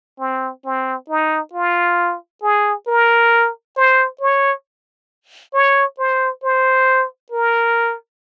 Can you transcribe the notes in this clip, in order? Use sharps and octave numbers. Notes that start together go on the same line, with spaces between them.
C4
C4
D#4
F4
G#4
A#4
C5
C#5
C#5
C5
C5
A#4